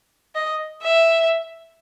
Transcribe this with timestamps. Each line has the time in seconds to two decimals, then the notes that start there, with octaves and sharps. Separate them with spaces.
0.35 D#5
0.82 E5